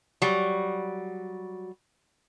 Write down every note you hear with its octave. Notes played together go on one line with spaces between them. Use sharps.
F#3 G3